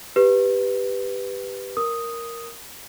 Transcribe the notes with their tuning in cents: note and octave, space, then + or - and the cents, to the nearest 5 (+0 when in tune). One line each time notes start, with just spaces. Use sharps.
G4 +5 B4 +0
A#4 +0 D#6 +0